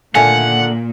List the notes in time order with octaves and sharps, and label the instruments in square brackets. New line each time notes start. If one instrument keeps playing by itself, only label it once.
[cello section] A#2 [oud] D3 D#3 A3 [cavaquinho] F5 G#5 [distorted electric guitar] F#5